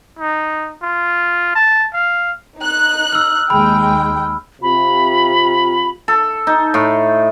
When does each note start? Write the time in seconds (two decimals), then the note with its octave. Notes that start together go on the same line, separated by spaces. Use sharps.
0.19 D#4
0.82 F4
1.55 A5
1.94 F5
2.59 D#4 F#6
3.12 E6 F6
3.50 D#2 G#3 G5 B5
4.62 C3 F4 B5
6.08 A4
6.47 D#4
6.74 A2